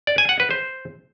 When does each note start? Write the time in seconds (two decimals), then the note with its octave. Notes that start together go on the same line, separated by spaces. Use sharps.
0.07 D5
0.18 G#5
0.29 F#5
0.40 B4
0.51 C5